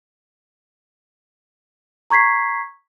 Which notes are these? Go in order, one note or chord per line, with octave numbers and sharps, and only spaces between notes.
A#5 C#6 G#6 B6 C7